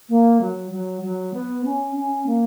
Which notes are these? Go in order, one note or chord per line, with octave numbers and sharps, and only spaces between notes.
A#3
F#3
F#3
F#3
B3
C#4
C#4
A#3